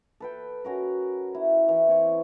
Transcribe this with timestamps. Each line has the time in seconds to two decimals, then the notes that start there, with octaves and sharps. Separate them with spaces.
0.20 A4 B4 G5
0.65 C#4 F#4 A#4
1.35 E4
1.69 E3
1.88 C4 C#5 C#6